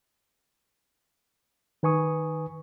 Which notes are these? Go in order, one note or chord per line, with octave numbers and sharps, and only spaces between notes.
D#3 B4 G#5 C#6 D#6